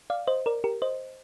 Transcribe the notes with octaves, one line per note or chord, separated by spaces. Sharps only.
D5 F5
C5 D#5
A#4 D5
G4 A#4
C5 D#5